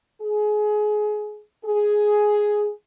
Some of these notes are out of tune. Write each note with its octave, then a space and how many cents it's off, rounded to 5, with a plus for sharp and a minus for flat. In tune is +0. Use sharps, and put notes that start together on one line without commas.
G#4 +25
G#4 +5